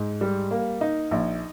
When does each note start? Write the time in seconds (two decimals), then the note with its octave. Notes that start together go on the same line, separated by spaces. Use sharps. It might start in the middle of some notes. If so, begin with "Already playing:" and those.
Already playing: G#2
0.21 G3
0.51 A#3
0.81 D#4
1.11 A#1